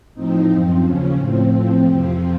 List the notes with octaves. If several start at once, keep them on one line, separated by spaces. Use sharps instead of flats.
A2 F3 C4 D#4
F#2 F3 C4
D#2 C#3 F3 C#4
A2 F3 C4
A2 F3 C4
F2 C3 F3